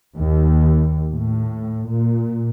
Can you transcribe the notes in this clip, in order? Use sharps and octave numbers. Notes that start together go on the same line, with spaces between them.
D#2
A2
A#2